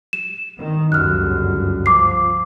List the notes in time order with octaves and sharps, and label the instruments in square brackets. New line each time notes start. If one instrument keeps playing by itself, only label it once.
[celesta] E7
[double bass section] D#3
[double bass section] G1 C#2 F#2 [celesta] F6 F#6
[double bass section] F3 [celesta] D6 C7